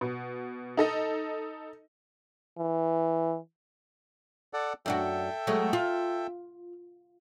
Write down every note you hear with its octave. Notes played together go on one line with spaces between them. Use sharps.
B2
D#4 A4 D#5
E3
A4 D5 F#5
F#2 D4 F#4 A4 E5 G5
F#3 G#3 A3
F4